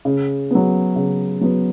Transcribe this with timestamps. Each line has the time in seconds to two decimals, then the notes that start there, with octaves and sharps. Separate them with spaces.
0.05 C#3
0.51 F#3 B3
0.96 C#3
1.41 F#3 B3